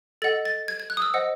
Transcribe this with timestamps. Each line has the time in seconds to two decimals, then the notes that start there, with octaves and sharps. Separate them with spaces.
0.22 A4 D#5 F#5 A6
0.45 A6
0.68 G#6
0.80 G#6
0.90 F#6
0.97 D#6
1.02 E6
1.14 C5 D#5 F#5